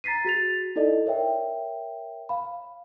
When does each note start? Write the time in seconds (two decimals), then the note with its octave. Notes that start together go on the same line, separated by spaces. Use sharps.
0.04 A#5 A6 B6 C7 D#7
0.25 F#4 G#4 A6 F7
0.76 D#4 E4 A4 D5 D#5
1.06 A#4 C#5 E5 G5
2.29 F5 B5